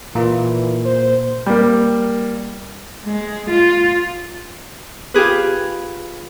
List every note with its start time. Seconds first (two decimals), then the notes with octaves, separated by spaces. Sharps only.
0.15 A#2 E3 A#3 F4
0.86 C5
1.46 G3 A#3
3.05 G#3
3.50 F4
5.14 F4 G4 G#4 B4